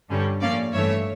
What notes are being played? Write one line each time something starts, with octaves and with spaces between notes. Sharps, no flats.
G2 D3 G3 C#4
A2 F3 A#3 C#4 D5 F5
G2 E3 A3 C#5 E5